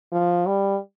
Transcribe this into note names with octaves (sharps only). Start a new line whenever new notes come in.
F3
G3